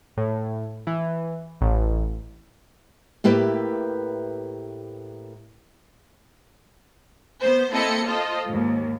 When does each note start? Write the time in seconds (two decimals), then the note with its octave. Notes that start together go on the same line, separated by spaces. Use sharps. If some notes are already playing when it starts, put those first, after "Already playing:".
0.17 A2
0.87 E3
1.61 A1
3.24 A2 A#3 G4 B4 E5
7.41 B3 C5
7.71 A#3 C4 E4 A4 D#5 C#7
8.04 F4 A4 C5 D#5
8.45 D#2 G#2